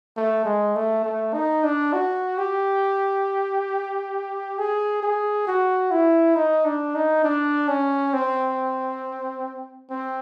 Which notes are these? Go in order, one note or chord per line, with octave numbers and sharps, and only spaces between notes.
A3
G#3
A3
A3
D#4
D4
F#4
G4
G#4
G#4
F#4
E4
D#4
D4
D#4
D4
C#4
C4
C4